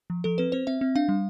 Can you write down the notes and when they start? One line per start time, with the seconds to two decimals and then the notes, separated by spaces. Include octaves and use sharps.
0.10 F3
0.24 F3 A4
0.38 C4 B4
0.52 C4 C5
0.67 C4 E5
0.81 C4
0.96 D4 F5
1.09 G3